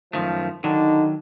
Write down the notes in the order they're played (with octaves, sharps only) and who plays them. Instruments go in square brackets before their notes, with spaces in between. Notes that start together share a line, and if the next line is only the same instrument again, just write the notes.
[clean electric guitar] F#2 D#3 A3 [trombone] F3
[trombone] D3 [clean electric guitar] D#3 F#3 [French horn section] D#4